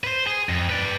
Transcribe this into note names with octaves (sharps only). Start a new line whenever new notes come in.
B4 C5
G#4
F2
B4 D5